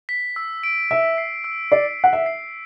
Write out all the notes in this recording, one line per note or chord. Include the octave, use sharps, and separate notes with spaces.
B6
E6
D7
E5 E6
C7
E6
D5 C7
F#5 C7
E5
C7